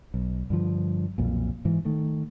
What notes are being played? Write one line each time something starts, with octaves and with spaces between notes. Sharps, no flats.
B1
G2 D3 F3
B1 F2 A#2
G#2 E3
D#3 A3